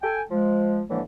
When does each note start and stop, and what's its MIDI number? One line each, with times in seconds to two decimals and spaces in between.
0.03 0.22 69
0.03 0.22 79
0.03 0.22 80
0.30 0.82 53
0.30 0.82 56
0.89 1.00 45
0.89 1.00 50
0.89 1.00 52
0.89 1.00 53
0.89 1.00 56
0.89 1.00 58